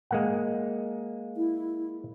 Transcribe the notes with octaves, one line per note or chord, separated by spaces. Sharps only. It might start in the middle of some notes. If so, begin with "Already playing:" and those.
G#3 A#3 F#5
E4